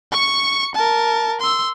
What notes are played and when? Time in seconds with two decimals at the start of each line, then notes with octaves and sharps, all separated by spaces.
0.12 C#6 C#7
0.75 A#4 A5
1.40 C6 E6